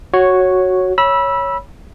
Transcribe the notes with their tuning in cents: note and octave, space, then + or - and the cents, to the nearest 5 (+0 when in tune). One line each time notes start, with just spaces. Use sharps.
F#4 +0 C#5 -5
C#5 +0 B5 -25 E6 +0